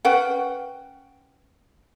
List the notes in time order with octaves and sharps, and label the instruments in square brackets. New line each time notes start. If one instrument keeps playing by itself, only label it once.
[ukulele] C#4 B4 F#5 G5